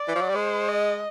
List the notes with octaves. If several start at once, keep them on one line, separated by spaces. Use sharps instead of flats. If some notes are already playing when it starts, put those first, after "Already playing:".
Already playing: D5
E3
F3
F#3
G3
G#3 C5
D#5